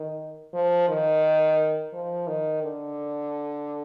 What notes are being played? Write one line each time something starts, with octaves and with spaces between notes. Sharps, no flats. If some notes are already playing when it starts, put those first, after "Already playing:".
Already playing: D#3
F3
D#3
F3
D#3
D3